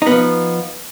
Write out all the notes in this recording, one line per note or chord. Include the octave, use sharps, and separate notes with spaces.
F3 B3 D#4